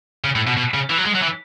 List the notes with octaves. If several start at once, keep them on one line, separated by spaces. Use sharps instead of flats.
C#3
A2
B2
B2
C#3
E3
F#3
G#3
F#3
E3